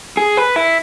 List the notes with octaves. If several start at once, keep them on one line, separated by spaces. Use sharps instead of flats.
G#4
B4
E4